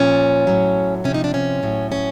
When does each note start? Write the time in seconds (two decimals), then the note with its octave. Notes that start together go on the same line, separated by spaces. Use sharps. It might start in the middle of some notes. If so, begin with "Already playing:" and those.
Already playing: A#2 F3 C#4
0.47 A2 F#3
1.04 C3 F3 C#4
1.14 D#4
1.24 D4
1.34 C#4
1.63 A2 F#3
1.92 C#4